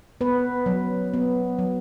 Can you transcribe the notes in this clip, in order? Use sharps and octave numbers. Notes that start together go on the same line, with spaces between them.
B3 B4
F#3
B3
F#3